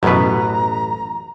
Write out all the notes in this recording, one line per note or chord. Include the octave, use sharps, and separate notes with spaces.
A1 F#2 B2 B4 A#5